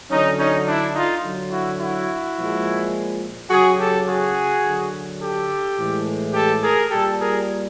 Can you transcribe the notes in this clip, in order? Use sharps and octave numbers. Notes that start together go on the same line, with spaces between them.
D3 F#3 C#4 D#4
C#4 D#4
D4 E4
D#4 F4
D3 F#3
E4 F#4
E4 F#4
A#2 F3 G#3
C#3 F#3 F#4 G#4
G4 A4
F#4 G#4
D3 F#3
G4 A4
A2 E3 G#3
G4 A4
G#4 A#4
A#2 G3 G4 A4
G#4 A#4